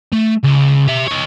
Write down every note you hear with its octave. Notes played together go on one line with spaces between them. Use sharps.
A3
C#2
G4 E5
D#4 C#5